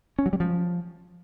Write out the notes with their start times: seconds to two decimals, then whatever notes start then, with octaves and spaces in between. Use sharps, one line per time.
0.19 C#4
0.26 F#3
0.33 G3
0.40 F3